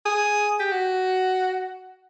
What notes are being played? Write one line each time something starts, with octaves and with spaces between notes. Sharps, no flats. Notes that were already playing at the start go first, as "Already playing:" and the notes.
G#4
G4
F#4